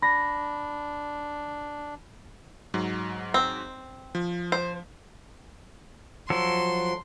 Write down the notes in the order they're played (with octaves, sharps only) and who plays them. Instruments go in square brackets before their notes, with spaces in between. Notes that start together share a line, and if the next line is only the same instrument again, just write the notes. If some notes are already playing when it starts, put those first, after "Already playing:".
[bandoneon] D4 [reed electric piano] B5 [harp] A#6
[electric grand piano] G#2 F#3
[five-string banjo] C4
[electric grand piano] F3
[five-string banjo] C5
[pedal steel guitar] F3 F#3 A4 [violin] C6